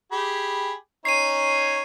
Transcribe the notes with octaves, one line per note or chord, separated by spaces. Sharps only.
G4 G#4 B5
C#4 D#4 C#5 C7 D#7